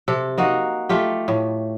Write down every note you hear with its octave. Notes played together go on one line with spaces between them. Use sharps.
C3 A4
A#3 D#4 F#4
A3 F4 G4
A2